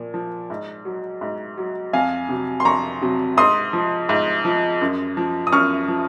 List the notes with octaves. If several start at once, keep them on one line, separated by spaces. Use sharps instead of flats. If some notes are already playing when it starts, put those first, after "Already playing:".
Already playing: A#2 F3
F3
G#2
F#3
G#2
F#3
F2 F5 G#5
C3 F#3
C6
F2 A#5 C#6
C3 F#3
G#2 C6 D#6
F3
G#2
F3
F#2
F3
D#6
F#2 C#6 F6
F3